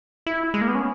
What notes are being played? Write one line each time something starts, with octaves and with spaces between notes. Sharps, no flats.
E4
G#3
A#3
B3
C#4